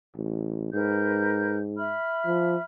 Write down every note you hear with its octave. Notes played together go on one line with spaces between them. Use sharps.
A1
G#2 A#4 B4 G6
E5 B5 F6
F3